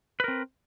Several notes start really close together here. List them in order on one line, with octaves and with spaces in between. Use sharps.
B4 A#4 C4